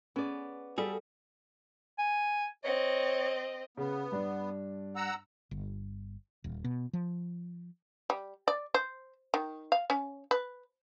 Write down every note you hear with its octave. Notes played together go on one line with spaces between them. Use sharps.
B3 C#4 G#4 D5
G3 F#4 G#4 A4
G#5
C4 C#5 D#5
C#3 B3
G2 D4
F#5 A#5 E6
G1
D#1
B2
F3
G3
D5
C5
D#3
F5
C#4
B4